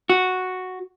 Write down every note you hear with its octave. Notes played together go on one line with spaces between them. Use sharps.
F#4